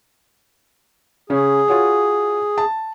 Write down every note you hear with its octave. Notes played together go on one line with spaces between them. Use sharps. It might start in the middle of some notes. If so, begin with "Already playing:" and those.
C#3 C#4 G#4
F4 F#4 C#5
A5